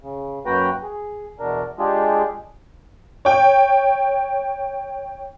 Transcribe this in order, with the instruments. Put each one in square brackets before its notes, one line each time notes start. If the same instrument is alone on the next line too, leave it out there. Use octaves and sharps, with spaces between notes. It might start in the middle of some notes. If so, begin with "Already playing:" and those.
[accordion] C#3
F#2 A#3 F#4 B4 G5 A#5
G#4
E2 B2 D4 A#4
G#3 D4 F4 G4 G#4
[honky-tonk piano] C#5 G5